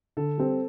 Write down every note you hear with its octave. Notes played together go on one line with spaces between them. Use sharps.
D3 A4
G3 C4